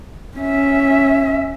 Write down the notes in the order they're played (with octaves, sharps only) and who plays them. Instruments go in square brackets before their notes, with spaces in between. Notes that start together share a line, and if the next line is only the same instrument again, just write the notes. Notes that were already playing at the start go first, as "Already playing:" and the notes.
[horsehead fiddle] C#4 E5